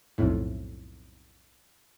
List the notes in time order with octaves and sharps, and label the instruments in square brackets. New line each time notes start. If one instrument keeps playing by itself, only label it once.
[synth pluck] B1 F2 A2